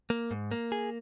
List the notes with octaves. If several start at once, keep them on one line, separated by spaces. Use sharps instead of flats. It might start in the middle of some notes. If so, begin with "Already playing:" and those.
A#3
G#2
A#3
G#4